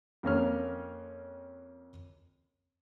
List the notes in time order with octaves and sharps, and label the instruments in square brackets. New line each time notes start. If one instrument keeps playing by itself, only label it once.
[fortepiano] F2 A#3 C#4 F6